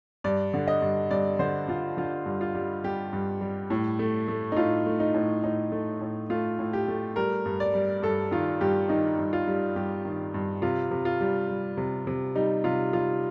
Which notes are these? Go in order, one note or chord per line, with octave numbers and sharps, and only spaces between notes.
G2 D5
D3
D#5
G2
G2 D5
D3 C5
D3 F4
D3 F4
G2
F4
G3
G3 G4
G2
G3
A2
A3
A3
D#4
A2 F4
A3
D#4
A2
A2 D#4
A3
A2
A3 F4
A2
G4
A3
G3 A#4
G2
D5
G3
G2 A4
D#3 F4
G2 G4
D#3 D#4
G2
F4
G3
G2 G4
D#3
G2
C3 F4
C3
F4
G3
G3
C3
C3
G3 D#4
C3 F4
G3 F4